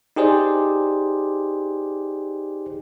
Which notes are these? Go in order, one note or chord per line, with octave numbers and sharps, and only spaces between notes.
D#4 G4 G#4 C5 D5